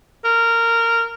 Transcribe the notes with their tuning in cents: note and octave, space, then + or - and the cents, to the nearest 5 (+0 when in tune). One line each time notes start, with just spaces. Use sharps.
A#4 -15